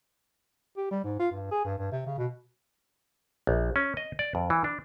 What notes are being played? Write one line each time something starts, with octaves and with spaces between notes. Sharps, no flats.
G4
G3
G#2
F4
G2
G#4
G2
G2
C3
C#3
B2
A#1
C#4
D#5
D5
F2
E3
D4